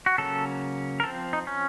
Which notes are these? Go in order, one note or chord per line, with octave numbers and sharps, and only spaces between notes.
F#4
C#3 F#3 A#3 C#4 A4
A#4
F3 C4 A4
D#4
C#4